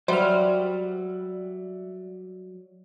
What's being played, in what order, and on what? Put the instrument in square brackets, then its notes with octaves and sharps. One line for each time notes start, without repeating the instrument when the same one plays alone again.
[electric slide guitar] F#3 [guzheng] G3 [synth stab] C5 F6 [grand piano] D5 E5 F#5